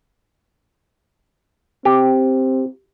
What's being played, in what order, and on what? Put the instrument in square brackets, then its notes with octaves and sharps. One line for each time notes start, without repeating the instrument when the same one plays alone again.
[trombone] C4 [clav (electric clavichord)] G4